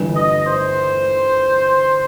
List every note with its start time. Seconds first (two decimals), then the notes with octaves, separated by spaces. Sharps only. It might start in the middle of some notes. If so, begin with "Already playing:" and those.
Already playing: G1 G2 E3
0.14 D#5
0.46 C5